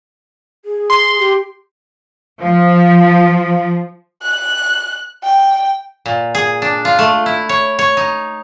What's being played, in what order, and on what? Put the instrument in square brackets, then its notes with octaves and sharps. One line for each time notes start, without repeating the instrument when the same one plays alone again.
[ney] G#4
[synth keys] C6
[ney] G4
[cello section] F3
[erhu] F#6
G5
[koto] A#2
G#4
D4
F4
A3
E4
C#5
C#5
D#4